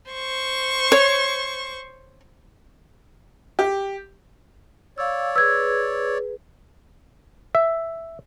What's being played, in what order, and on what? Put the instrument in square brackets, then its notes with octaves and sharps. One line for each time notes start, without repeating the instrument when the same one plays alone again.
[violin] C5 C#6
[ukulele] C#5
[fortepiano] G4
[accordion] C#5 D5 [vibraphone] F5 E6
[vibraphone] G#4 B4 [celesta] E6 G#6
[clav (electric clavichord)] E5